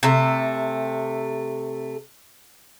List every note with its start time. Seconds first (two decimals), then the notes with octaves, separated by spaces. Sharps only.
0.03 C3 A3